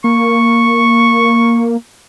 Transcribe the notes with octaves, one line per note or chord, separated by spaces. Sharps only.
A#3 C#6